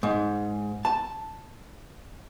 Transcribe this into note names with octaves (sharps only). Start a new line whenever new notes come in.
G#2
A5